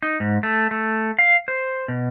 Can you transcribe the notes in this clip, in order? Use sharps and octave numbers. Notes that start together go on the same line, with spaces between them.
D#4
G#2
A3
A3
F5
C5
B2